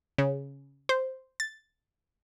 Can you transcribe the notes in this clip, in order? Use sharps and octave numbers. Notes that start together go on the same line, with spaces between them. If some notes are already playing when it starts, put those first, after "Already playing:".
C#3
C5
A6